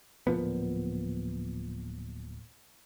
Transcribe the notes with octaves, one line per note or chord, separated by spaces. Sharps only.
D1 A#2 F3 B3